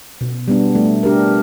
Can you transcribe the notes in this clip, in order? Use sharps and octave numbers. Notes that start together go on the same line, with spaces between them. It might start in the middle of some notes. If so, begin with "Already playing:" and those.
B2
G3 B3 D4
A3
D4 G4 A#4